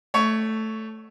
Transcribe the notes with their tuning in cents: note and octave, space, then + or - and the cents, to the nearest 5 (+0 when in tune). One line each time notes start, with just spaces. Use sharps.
A3 +0 C#5 +10